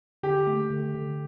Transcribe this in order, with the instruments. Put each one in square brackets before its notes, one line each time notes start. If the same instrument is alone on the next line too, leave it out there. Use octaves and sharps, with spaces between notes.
[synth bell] D3 [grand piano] G4
[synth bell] A3
D3
D3